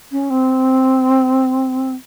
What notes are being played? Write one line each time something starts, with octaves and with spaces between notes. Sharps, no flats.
C#4
C4